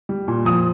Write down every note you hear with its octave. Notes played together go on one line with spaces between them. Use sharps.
G3
A#2
F3 D#6